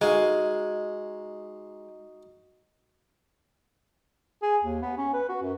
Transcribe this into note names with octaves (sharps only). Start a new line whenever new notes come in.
G#3 D#4 F#4 F5
G#4
D#2
B3
C#4
B4
F#4
F#2